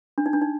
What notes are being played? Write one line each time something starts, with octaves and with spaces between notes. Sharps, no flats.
D4
D#4
D4
D#4